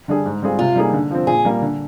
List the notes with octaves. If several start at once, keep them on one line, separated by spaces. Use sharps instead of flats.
D3 G3 D4 G#4
G#2
G3 C4 F4 G#4
C3 F4
G3 A#3 D#4 G#4
D3
F3 C4
A#2 G#4
G3 A#3
D3